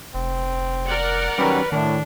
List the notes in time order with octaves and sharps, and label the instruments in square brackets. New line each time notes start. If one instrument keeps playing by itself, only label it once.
[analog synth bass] F1 [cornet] C4
[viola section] A#4 D5 F#5
[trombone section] D#3 F#3 G3 [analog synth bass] C#4 [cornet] B4
[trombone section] A2 [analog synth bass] D#3 [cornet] D4